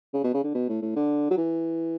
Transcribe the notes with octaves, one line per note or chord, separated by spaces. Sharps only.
C#3
B2
C#3
D3
B2
A2
A2
D3
F#3
E3